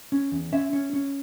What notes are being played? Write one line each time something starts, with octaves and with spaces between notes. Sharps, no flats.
C#4
E2
C#4 E5
C#4
C#4